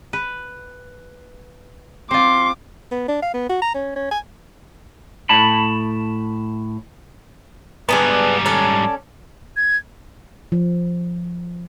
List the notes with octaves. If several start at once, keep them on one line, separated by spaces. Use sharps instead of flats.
B4
C4 F4 C6 D6
B3
D4
F5
B3
F#4
A#5
C#4
C#4
G#5
A2 A5 B5
G#2 G3 B3 D4 G#4
C#4 D4 A4
G#6
F3